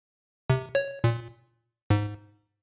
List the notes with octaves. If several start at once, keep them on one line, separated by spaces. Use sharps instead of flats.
C3
C#5
A#2
G#2